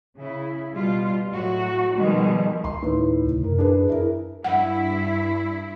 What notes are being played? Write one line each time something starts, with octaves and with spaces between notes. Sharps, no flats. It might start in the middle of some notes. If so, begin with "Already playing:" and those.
C#3 E4
B2 G3 F4
A2 F#3 F#4
B2 D#3 F3 G3 G#3
D2 C6
A2 D#3 B4
C3
F#2 A#4
D4 G#4 B4
E4 A#4
G2 E4 F#5